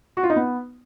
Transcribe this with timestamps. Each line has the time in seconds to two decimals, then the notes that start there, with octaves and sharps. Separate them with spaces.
0.17 F#4
0.23 F4
0.30 D#4
0.36 B3